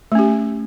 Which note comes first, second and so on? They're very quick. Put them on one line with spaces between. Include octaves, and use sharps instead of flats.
A3 C#4 G4